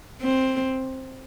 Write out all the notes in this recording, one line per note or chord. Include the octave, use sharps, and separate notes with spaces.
C4